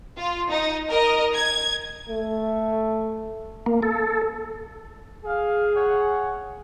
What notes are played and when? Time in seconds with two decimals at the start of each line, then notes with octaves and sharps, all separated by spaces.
0.17 F4
0.51 D#4
0.90 A#4 D#5
1.35 G#6
2.09 A3
3.66 A#3
3.82 A4
5.25 G#4 F5
5.76 C#5 F#5